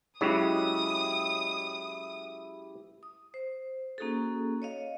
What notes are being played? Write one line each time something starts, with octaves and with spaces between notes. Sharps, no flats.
C#3 F#3 G#3 E4 G4 D#6
D#6
C5
A#3 C#4 D#4 F#4 G#4 A4
C#5 D#5 F5